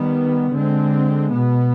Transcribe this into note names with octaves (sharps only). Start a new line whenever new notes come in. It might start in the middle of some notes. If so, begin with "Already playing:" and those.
Already playing: D#3 G3 B3
D3 G#3 C4
B2 B3